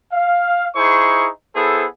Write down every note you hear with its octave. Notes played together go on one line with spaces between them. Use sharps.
F5
D#4 E4 G#4 C5 C#6
B3 E4 G#4 A4 C5